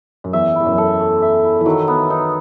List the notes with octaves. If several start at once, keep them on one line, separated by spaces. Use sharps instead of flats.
F#2
E2 E5
E4
E2
F#2
A4
A3
E5
E4
E3
D#3 F#3
B3
D#4